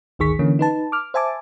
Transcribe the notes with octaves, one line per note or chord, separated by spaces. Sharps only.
G#1 D2 D#3 G#4 C#6 B6
D3 E3 A#3 C#4
D#4 B4 A5
D6 F6
C5 E5 G#5 A5 D6